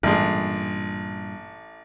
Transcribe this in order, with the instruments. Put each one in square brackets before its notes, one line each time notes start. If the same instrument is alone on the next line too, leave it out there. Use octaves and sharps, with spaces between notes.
[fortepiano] A1 G#3 [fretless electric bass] G2 A#2